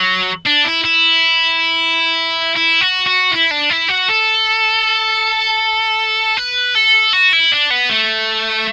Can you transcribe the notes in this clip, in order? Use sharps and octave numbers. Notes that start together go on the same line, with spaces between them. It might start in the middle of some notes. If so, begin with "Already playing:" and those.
Already playing: F#3
D4
E4
E4
E4
F#4
F#4
E4
D4
E4
F#4
A4
B4
A4
F#4
E4
D4
B3
A3